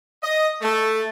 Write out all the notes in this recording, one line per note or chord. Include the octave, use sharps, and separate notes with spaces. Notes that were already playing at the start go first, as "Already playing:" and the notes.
D#5
A3